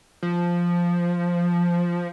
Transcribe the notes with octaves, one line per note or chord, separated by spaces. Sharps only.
F3